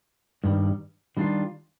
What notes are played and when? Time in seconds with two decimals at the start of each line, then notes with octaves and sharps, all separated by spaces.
0.44 G2 D#3 G3
1.17 D#3 G3 D4 F4